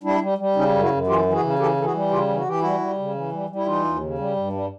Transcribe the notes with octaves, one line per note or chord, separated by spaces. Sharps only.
G3 D4 E4
G3
G3
C#3 C#4 D#4
F#2
E4 F#4
F#2
E3 F4 G4
E3
F#4 G#4
C#3
E3 G4 A4
E3 A4
F#4 G#4
G3
C#3 F4 G4
E3
F#4
E3 G4
G3 E4 F#4
G3
C#3
E3
G3
G3
E4
E3 D#4 F4
D#2
C#3
G3
G2
G3